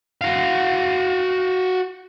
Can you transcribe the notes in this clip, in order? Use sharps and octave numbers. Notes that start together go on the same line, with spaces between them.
F#4 F5